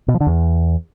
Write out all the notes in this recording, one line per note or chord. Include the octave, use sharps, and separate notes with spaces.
B2
F3
D3
E2